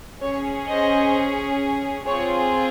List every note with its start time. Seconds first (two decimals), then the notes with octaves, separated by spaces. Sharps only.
0.22 C#4 G#4 C#5
0.68 C5 D#5
2.07 C4 F4 G#4 C#5